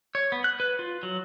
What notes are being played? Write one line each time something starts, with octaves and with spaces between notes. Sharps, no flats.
C#5
B3
F#6
B4
F4
F#3